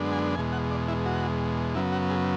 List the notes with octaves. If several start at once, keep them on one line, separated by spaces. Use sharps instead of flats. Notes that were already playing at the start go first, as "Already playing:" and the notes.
Already playing: F#2 D3 G#3 B3 D4
G#5
E2 B2 G#3 G#5
F#5
D5
E4
F#4
F#2 C#3 F#3 B3 E4
F#4
G#4